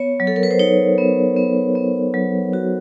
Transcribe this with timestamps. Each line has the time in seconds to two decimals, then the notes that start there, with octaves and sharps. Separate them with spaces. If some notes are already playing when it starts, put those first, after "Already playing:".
Already playing: B3 C#5
0.20 F#3
0.27 A4
0.36 A#4
0.43 B4
0.51 C5
0.59 D#4 C#5
0.98 B3
1.36 B3
1.75 B3
2.14 F#3
2.53 F#4